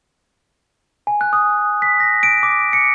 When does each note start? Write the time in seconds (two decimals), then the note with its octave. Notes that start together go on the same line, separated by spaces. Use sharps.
1.07 G#5
1.21 F#6
1.33 D#6
1.82 B6
2.00 A#6
2.23 D7
2.43 D6
2.73 C#7